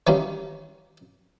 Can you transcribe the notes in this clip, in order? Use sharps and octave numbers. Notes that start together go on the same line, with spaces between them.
D#3 E3 G3 G#3 A#3 C#4